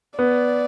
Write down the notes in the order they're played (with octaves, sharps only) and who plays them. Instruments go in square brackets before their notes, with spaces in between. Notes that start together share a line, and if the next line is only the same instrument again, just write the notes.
[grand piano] B3 [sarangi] D5